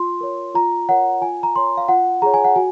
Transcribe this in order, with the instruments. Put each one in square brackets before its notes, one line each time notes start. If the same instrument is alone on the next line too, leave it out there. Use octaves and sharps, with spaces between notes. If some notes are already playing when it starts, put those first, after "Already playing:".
Already playing: [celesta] F4 C6
A#4 C#5
F4 A#5
A#4 C#5 F#5
F4 G#5
A#5
A#4 C#5 C6
F5
F4 F#5
G#4 C#5 A#5
G#5
F#5
F#4 G#5